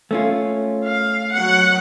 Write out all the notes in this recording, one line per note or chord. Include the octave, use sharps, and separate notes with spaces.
A3 C#4 F4
F5
F#3 F#5